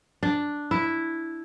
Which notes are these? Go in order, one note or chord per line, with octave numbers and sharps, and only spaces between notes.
D4
E4